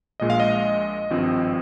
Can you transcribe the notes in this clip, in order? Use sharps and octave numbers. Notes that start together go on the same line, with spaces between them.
A#1 A#2 G#3 D#5
F5
D#5
G#1 G2 F3 C4